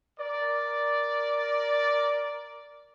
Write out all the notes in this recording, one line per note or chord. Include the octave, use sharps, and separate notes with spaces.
A#4 D5